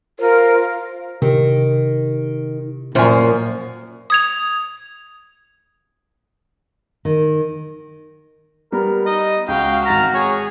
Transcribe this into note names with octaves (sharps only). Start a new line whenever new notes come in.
F4 A#4 C5
C3 D#3
F#2 A#2 F3 C5 G#5
D#6 G#6 F7
D#3
G3 B3 A#4
D#4 D#5
C#2 F#4 F5 G5
G#1 A#5 F6 A6 B6
G#4 C#5